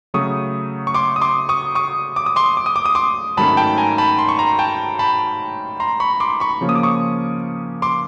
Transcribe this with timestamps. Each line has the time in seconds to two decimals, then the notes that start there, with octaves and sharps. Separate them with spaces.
0.14 C#3 F#3 A3 C#6 D#6
0.87 C#6
0.95 C6 D6
1.16 D#6
1.21 C6 D6
1.49 C#6 D#6
1.75 C#6 D#6
2.16 D6
2.26 D#6
2.36 C6 D6
2.57 D6
2.66 D#6
2.76 D6
2.85 D#6
2.95 C6 D6
3.37 G#2 D#3 F#3 A3 C#4 A5 B5
3.57 G5 A5
3.78 G#5 A#5
3.98 A5 B5
4.19 C6
4.29 C#6
4.39 A#5 C6
4.59 G5 A5
4.99 A5 B5
5.80 A#5 C6
6.00 B5 C#6
6.20 C6 D6
6.40 B5 C#6
6.61 C#3 F3 A#3 C#4
6.69 D#6
6.75 D6
6.83 C#6 D#6
7.82 C6 D6